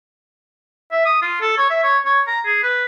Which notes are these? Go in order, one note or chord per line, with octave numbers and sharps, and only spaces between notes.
E5
D#6
F4
A4
C#5
E5
C#5
C#5
A#5
G#4
B4